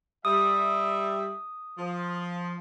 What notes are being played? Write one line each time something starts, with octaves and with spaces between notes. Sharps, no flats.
G3 E5 D#6
F3